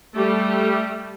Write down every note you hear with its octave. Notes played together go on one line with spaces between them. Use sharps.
G3 A3 G4